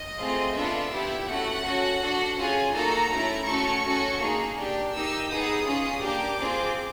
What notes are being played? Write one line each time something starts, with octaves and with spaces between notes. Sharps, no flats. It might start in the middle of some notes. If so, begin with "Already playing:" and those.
Already playing: D#5
A3 C4 F4 G#4
B3 D4 F4 A4 E5
B3 E4 G4
A3 C#4 F#4 F#5
C#4 F#4 A4
D4 F#4 A4
C#4 F4 G#4 G#5
A#3 D#4 F#4 A4 A#5
A3 C#4 E4
A3 C#4 F#4 A4 C#6
C#4 F#4 A4
A#3 D#4 G#4
D4 G4
A#3 D#4 G4 E6
B3 D#4 G#4 D#6
C#4 F4 G#4
A#3 D4 G4 D6
C4 F4 G#4